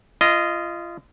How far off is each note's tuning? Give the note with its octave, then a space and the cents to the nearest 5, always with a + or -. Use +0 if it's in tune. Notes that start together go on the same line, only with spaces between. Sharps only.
F4 -30 D#5 +0